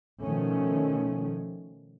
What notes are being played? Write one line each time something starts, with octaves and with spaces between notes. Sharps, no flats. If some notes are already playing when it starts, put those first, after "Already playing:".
B2 D#3 F3 A3 C#4